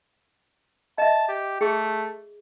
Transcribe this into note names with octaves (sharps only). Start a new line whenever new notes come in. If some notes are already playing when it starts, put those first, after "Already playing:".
D#5 E5 A5
G4
A3 G#4